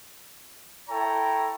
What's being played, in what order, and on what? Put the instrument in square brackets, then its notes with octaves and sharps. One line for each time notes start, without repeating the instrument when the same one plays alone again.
[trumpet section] E4 A4 C#5 G5 A#5